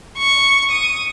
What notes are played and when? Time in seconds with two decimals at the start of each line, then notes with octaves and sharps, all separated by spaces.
0.18 C#6
0.71 D#6